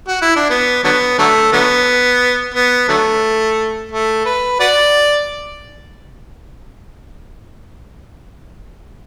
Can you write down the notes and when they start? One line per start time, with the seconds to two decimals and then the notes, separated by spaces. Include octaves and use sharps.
0.08 F#4
0.22 E4
0.36 D4
0.50 B3
0.84 D3 F#3 B3
1.18 D3 F#3 A3
1.53 D3 F#3 B3
2.54 B3
2.88 D3 F#3 A3
3.92 A3
4.26 B4
4.60 F#4 B4 D5